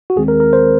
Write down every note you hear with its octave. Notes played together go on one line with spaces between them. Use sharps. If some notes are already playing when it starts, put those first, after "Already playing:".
F#4
D#2 D#3 G#3 C4 G#4
A#4
A#4
C5